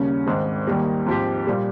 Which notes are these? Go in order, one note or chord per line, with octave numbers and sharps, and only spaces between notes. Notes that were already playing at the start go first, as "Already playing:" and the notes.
Already playing: D#2 C#3 G3 A#3 C#4
G#1 G#2 D#3 G#3 C4
D#2 D#3 G3 A#3
G#2 F3 C4 G4
A#2 G3